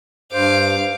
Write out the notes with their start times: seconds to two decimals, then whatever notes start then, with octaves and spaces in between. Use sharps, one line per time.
0.33 G2 C5 F5 D6